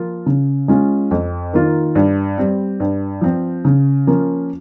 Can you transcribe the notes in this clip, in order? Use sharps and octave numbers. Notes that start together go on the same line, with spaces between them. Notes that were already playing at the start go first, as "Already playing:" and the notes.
Already playing: F3 A#3 F4
C#3
G#3 C#4 F4
F2
D#3 A#3 F4
G2
G3 C4
G2
F3 C4
C#3
F3 A#3 C#4 F4